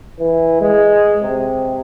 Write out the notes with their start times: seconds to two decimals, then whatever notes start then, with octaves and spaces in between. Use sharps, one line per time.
0.20 E3
0.61 G#3
1.23 C3